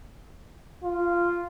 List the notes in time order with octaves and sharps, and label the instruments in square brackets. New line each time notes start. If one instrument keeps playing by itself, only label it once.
[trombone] F4